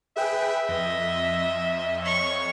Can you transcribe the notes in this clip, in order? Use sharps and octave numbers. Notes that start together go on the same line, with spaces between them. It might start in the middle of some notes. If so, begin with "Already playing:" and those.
G#4 B4 E5 G5
F2 D#5
C#5 D#5 C#6